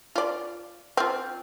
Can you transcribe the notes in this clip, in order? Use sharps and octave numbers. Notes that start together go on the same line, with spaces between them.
F4 D5
C4 F4